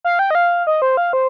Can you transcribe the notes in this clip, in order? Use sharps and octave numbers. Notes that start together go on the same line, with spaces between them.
F5
G5
D#5
F5
D#5
C5
F5
C5